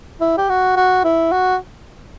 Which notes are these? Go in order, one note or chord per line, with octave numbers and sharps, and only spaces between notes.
E4
G4
F#4
F#4
E4
F#4